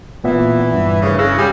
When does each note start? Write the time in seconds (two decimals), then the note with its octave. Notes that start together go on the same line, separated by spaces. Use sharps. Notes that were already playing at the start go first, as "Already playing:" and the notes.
0.24 A#2 E3 B3 E5
0.74 G2
1.02 D#2 A2 C#3
1.19 C#3 C#4 E6 F#6 A#6
1.38 G3 G#4 G5